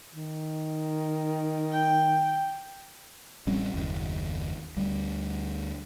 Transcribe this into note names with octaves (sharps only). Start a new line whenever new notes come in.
D#3
G5
A1 G3 C4 C#4
F#1 D#2
D2 G3